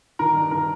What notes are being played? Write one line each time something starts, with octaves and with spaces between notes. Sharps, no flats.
D#3 A#4
G2
D#3 A#4